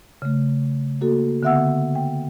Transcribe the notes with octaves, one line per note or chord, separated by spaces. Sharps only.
C#3 A3
A#3 F#4 A4
D3 B3 E5 F#5 E6
G5